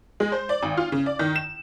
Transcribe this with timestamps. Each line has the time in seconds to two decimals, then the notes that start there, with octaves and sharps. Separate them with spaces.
0.20 G#3
0.32 C5
0.49 D5
0.63 G#1
0.77 F4
0.92 C#3
1.06 D5
1.19 D#3
1.36 E7